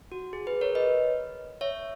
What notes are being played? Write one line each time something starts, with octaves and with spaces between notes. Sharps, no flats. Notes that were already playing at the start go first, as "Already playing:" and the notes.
F#4
G#4
G#4 B4
A#4 C#5
B4 D#5
C#5 E5